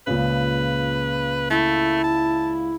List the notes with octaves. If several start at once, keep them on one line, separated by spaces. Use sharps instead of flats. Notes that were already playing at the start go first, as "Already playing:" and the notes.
C#2 A#2 C#3 B4
A3 E4
A5